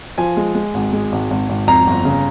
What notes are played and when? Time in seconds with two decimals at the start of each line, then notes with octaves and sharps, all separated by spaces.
0.18 F3 G#5
0.37 G#3
0.55 G#3
0.74 G#1
0.93 G#3
1.12 G#1
1.31 G#1
1.49 G#1
1.67 F2 A#5
1.87 G1
2.05 C#3